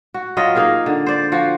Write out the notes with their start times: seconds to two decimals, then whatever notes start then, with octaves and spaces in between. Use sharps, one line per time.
0.14 F#4
0.37 F#3 F4 D#5
0.55 A#3 D#4 G#4 A#4
0.86 D3
1.06 C5 D5
1.32 F3 F#4